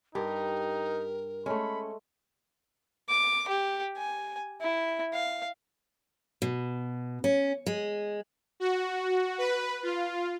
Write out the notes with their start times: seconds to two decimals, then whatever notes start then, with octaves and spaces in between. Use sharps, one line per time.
0.15 G2 D#4 G4 A#4
1.46 G#3 A3 C#4 B5
3.09 D6
3.49 G4
3.97 G#5
4.61 E4
5.13 F5
6.42 B2
7.24 C#4
7.67 G#3
8.60 F#4
9.38 B4
9.83 F4